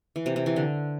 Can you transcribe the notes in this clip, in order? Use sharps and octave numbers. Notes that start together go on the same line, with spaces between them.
E3
C3
C3
E3
D3